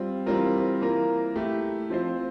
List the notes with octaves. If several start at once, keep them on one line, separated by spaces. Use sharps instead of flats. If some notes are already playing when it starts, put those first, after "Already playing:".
Already playing: G3 C4 F4
E3 G3 C4 F4 A#4
E3 A#3 F4 A#4
A3 E4 G4
F3 C4 F4 C5